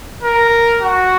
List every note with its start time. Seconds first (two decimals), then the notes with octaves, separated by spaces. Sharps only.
0.23 A#4
0.81 F#4